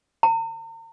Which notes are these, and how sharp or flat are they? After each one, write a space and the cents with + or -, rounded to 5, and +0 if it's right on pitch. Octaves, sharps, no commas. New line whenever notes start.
A#5 -45